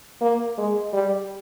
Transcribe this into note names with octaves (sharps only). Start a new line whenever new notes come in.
A#3
G#3
G3